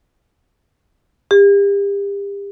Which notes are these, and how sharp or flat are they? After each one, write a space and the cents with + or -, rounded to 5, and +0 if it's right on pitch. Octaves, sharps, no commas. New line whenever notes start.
G4 +35